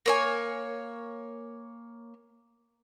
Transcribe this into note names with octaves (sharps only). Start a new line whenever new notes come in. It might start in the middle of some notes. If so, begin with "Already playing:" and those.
A#3 C#5 G#5